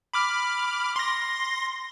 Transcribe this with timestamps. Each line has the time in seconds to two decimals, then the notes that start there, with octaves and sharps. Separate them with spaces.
0.14 B5 D6 F6
0.96 C6 A#6